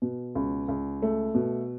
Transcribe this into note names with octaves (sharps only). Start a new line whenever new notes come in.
B2
C#2
C#2
A3
B2